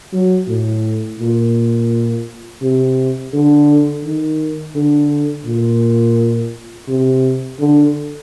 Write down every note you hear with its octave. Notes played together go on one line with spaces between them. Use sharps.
F#3
A2
A#2
C3
D3
D#3
D3
A#2
C3
D3